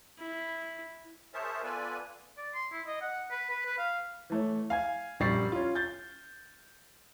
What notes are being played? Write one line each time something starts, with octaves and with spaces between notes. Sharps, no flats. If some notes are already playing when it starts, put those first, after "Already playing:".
E4
G#4 A#4 C5 C#5 E5 A5
B3 F4 A4 B4 D5 G#5
D5
C6
E4
D#5
F#5
B4
B4
B4
F5
E3 A3 C#5
F5 G#5 G#6
A#1 F#2 G3 C#6 A6 C7
C#4 F4
G6 A6